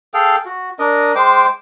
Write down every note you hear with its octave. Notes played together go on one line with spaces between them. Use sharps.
G#4 A4 F5 G5
F#4
D4 A#4 D#5
G#3 C5 G5 D6